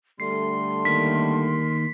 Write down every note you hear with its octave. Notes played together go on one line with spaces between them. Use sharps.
D3 G3 A3 C6 C7
D#3 A#3 B6